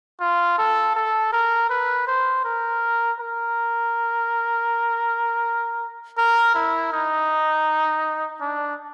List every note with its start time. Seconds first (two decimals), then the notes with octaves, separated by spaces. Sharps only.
0.20 F4
0.58 A4
0.95 A4
1.33 A#4
1.70 B4
2.07 C5
2.45 A#4
3.19 A#4
6.18 A#4
6.55 E4
6.92 D#4
8.41 D4